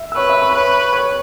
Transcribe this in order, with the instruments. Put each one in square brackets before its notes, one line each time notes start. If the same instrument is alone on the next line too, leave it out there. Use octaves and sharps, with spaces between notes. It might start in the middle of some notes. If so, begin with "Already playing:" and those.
Already playing: [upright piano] E5 E6
E6
[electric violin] B4 [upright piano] C#5 C#6
[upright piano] E5 E6
C#6
B5
[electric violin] B4 [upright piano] C#5 C#6
[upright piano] C#5 C#6